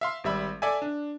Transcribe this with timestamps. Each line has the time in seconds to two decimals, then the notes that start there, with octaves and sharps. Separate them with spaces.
0.01 E5 F5 C6
0.24 G#1 G3 E5 B5
0.62 A4 D5 E5 G#5
0.82 D4